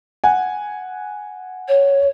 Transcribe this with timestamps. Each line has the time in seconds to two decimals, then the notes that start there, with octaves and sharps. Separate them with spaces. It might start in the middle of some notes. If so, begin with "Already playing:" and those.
0.24 F#5 G#5
1.68 C#5